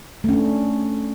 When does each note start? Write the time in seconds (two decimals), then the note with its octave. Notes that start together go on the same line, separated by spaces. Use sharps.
0.24 A3
0.29 C#4
0.33 D4